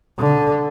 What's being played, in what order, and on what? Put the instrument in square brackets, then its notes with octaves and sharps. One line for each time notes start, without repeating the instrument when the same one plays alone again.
[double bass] D3